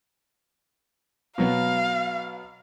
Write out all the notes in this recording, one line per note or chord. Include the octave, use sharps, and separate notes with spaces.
B2 F#3 B3 F5